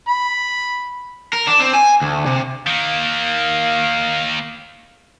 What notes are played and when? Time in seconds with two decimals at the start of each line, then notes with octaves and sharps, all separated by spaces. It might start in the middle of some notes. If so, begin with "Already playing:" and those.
0.08 B5
1.33 A#4
1.47 D4
1.60 C4
1.73 G#5
2.02 D2
2.26 C3
2.67 D#3 A#3 F5